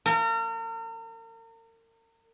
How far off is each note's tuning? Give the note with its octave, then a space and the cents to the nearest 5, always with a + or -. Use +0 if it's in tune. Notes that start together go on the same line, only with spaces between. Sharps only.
A#4 -40